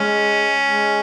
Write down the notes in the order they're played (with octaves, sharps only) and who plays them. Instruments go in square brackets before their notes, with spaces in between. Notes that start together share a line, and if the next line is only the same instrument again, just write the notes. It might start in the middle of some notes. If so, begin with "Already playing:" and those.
Already playing: [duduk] G#3 [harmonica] C#4
[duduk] G#3